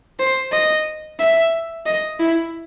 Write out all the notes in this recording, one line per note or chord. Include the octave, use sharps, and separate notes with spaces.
C5
D#5
E5
D#5
E4